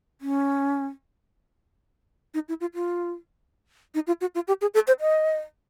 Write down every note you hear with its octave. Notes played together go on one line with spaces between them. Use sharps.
C#4
D#4
E4
F4
F4
D#4
F4
F#4
F4
G4
G#4
A4
C5
D#5